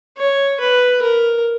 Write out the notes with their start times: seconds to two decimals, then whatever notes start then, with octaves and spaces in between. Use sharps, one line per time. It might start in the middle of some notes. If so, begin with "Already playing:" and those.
0.17 C#5
0.61 B4
1.02 A#4